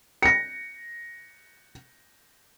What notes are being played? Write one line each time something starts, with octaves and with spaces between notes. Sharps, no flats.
A#6 C#7